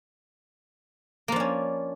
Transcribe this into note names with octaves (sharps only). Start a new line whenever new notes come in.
F3 A#3 C#4 D4